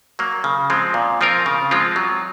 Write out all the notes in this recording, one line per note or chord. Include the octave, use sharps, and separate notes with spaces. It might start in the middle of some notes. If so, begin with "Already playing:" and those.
F#3 A#3
C#3
F3 G#3 C4
A#2
F3 C4 F4 A#4
C#3
F3 G#3 C4 F4
F#3